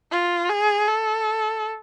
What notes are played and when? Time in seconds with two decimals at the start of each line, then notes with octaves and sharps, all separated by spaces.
0.11 F4
0.49 G#4
0.88 A4